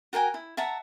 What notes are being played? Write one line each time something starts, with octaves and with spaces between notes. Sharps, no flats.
F#4 A#4 G5 G#5
E4
E5 F#5 A5 A#5